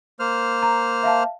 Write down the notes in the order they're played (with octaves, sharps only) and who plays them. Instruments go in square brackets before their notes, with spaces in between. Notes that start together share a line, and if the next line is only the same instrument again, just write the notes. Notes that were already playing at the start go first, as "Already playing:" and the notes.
[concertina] A#3 C5 F6
[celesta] A#5
E5 F5 A5